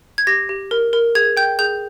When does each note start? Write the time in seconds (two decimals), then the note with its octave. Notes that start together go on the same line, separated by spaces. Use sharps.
0.18 G#6
0.27 G4 A#6
0.49 G4
0.71 A#4
0.93 A#4
1.15 G#4 G#6
1.37 G5 G6
1.59 G#4 G6